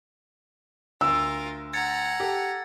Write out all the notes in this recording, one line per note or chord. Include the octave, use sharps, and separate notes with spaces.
D2 F4 A#4 E6
F#5 A#5 G#6 A6 C#7
G4 A4